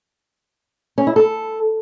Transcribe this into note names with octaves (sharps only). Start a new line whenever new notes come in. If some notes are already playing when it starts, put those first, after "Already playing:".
C#4
E4
A4